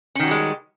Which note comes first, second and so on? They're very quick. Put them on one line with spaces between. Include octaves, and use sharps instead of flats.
C#4 D#3 F#4 G3 G#3